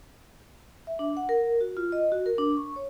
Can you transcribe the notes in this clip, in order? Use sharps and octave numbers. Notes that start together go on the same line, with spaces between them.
E5
D4
F#5
A#4
F#4
F4
D#5
F#4
A#4
D4
C#6
C#5